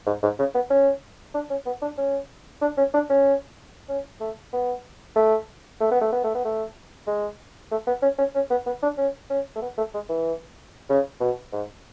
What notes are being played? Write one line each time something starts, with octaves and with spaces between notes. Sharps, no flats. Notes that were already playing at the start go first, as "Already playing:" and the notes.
G#2
G#2
C#3
B3
C#4
D4
C#4
B3
D4
C#4
D4
C#4
D4
C#4
C#4
A3
B3
A3
A3
B3
A3
B3
A3
B3
A3
G#3
A3
B3
C#4
C#4
C#4
B3
B3
D4
C#4
C#4
A3
B3
A3
G#3
E3
C#3
B2
G#2